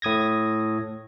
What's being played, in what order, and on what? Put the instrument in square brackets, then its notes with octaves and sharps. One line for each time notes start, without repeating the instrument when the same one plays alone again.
[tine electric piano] A2 D#6 G#6 A#6